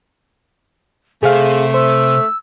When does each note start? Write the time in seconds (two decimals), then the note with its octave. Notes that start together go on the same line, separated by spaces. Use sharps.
1.23 C3 A3 G#4 C5 F5
1.74 C5 E6